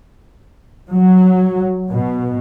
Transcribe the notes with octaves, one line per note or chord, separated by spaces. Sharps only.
F#3
B2